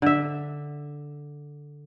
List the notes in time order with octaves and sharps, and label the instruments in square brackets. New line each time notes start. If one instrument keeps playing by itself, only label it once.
[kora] D3 E5